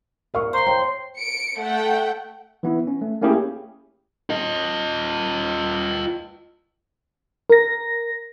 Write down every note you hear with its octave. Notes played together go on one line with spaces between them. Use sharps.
A#4 F5 C#6
C5 A#5 C6
C#5 G5
C#7 D7
A3 F#5 G5
E3 B3 E4
C#4
A3
A3 A#3 C#4 E4 G4 G#4
F4 D#5
A#4 A#6